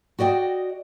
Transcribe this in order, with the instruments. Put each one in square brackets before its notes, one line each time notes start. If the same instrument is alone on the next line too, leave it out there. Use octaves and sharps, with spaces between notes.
[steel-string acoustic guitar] F#4 D5 D#5 G5